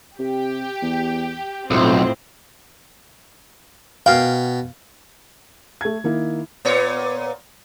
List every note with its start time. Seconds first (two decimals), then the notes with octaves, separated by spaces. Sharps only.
0.19 C3 G4
0.82 E2
1.71 B1 F2 A2 C4 E4 F4 C5
4.06 B2 F5 G5
5.81 A3 G#6
6.04 D#3 A#3 D#4 E4
6.65 A#2 B3 C#5